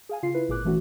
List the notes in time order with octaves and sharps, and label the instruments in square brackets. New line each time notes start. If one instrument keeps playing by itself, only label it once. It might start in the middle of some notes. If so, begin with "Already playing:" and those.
[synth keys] G#4 F5 G#5
C#3 F4 F5 C7
E4 B4
G#1 A#2 G#4 D6 F#6
E3 A3 C#4 F#4